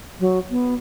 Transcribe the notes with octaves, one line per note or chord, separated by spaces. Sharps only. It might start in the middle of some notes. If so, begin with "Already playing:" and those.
F#3
B3